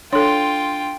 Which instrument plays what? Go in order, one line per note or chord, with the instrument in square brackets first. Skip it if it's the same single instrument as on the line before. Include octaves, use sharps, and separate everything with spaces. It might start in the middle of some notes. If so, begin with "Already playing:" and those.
[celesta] D4 C6 [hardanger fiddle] F4 G5 [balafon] A4 C#5